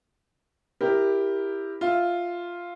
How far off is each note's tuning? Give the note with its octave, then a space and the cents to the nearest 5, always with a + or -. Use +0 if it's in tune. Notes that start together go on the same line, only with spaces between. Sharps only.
E4 +0 G4 +10 A#4 +0
F4 +0 E5 +0